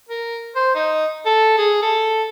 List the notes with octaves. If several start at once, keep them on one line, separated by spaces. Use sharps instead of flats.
A#4
C5
D#4
A4
G#4
A4